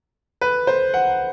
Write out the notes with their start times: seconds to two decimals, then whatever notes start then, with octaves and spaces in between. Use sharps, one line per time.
0.41 B4
0.67 C5
0.94 F#5